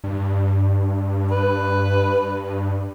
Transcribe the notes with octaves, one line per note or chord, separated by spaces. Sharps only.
G2
B4